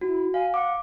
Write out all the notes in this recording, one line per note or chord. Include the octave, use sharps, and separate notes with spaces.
E4 F#4
F5 G#5
F#5 D6